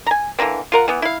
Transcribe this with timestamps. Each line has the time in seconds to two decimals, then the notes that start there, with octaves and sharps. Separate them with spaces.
0.06 G#5 A#5
0.39 D3 E3 A#3 C4
0.72 F4 A#4 F#5
0.88 E3 B3
1.02 E4 F5